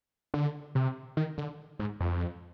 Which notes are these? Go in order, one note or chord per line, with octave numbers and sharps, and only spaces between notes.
D3
C3
D#3
D3
G#2
F2